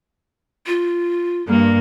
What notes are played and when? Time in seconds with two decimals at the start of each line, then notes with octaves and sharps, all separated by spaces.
0.67 F4
1.47 G2 A#3